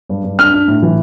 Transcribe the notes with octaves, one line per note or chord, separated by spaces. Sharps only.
G2
G2
D4 F6
D4
A2
E3